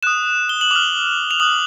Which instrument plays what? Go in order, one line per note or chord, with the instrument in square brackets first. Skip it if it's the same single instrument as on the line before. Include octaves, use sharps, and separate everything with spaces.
[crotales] D#6 F#6 E7
G7
F#7
D6 F6 F7
F7
D#6 F#6 F#7